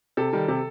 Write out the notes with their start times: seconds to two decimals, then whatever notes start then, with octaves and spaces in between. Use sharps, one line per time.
0.17 C3 A4
0.33 D#3 G3
0.48 C3